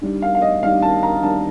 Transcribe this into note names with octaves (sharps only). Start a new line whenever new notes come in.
D#3 G3 D4
F5
F5
D#5
D#3 G3 D4 F5
A5
A#5
D#3 G3 D4 A5